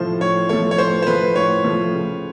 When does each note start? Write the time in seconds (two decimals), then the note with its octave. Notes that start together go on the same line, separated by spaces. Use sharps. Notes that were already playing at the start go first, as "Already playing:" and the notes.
Already playing: A2 F3 A3 C5
0.20 A2 C#5
0.49 F3 A3 C#5
0.71 C#5
0.78 A2 C5
1.02 C5
1.07 F3 A3 B4
1.35 A2 C#5
1.64 F3 A3
1.93 C#3